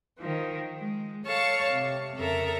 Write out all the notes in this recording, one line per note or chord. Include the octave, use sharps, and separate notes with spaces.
D#3 F3
G#3
A4 C#5 F5 A5 C#6
C3
F2 C#3 A4 A#4 E5 A#5